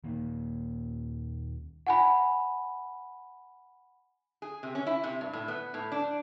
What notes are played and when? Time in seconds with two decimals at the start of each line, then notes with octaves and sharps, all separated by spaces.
0.04 D#1 D#2 A#3
1.87 F#5 G#5 B5
4.42 G#4
4.63 C3
4.75 C#4
4.87 E4
5.04 C3
5.21 G2
5.33 A2
5.48 B3
5.74 A2
5.92 D4